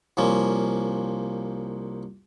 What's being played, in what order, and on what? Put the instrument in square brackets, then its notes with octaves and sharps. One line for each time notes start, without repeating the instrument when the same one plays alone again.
[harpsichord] C2 F3 A#3 C#4